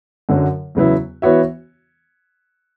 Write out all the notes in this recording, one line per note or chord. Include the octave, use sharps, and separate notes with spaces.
F#2 D3 F#3
E2 C#3 F#3 B3 E4
E3 B3 F#4 C#5 E5